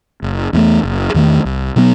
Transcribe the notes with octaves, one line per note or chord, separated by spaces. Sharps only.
F#1
E2 B2 A3
F#1
E2 D#3 A3
C2
B2 F#3 B3